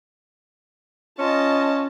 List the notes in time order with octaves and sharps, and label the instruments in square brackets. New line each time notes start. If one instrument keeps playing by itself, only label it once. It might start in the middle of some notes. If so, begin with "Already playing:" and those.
[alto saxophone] C#4 [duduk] F4 [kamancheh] D#5 A5